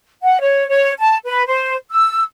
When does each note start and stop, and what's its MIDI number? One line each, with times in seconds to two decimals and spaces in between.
0.22 0.38 78
0.40 0.66 73
0.67 0.92 73
0.99 1.15 81
1.24 1.43 71
1.46 1.75 72
1.90 2.21 88